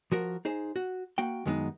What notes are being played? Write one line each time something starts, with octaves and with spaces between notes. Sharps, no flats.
F3 F#4 A#4
D#4 G#4 C5
F#4
A#3 F#4 G5
F#2 D#3 G#3 B3 C#4 D#4